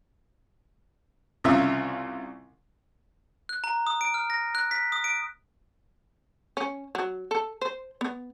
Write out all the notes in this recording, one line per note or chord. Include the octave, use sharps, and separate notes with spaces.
C2 C#3 F4 E5
F#6
A#5
D#6
D7
F6
A#6
F#6
B6
D#6
D7
C#4
F#3
A4
C5
B3